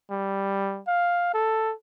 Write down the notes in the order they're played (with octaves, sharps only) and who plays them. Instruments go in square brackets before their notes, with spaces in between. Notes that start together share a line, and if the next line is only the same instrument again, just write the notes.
[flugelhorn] G3
F5
A4